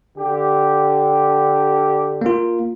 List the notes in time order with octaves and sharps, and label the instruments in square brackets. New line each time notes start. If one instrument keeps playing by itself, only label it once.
[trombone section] D3 G4
[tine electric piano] A#3 F4